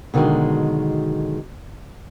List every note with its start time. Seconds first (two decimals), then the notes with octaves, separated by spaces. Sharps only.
0.14 B2 D3 D#3 F#3 G#3